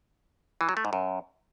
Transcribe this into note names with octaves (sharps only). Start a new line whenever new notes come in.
E3
F#3
A3
G#2
F#2